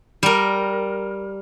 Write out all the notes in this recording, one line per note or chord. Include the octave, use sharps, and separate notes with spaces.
G3 A#4